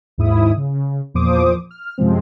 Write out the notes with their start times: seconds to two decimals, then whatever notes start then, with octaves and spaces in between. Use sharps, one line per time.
0.18 D#2 G#2 E4 D#6
0.57 C#3
1.14 E2 A#2 F3 C5 D6 D#6
1.71 F6
1.98 F#2 C3 F3 G#3 C4